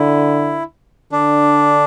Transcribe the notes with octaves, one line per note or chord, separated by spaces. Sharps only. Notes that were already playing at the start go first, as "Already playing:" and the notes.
Already playing: D3 E4
D3 D4